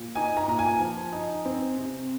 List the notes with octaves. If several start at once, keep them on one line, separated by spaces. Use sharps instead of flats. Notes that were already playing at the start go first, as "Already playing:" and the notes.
Already playing: A#2
D#4 G#5
A#5
A#2 A#5
G#5
F3
D#4
C4
C3